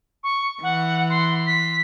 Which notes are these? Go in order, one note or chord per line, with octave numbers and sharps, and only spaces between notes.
C#6
E3 F#5
C6
B6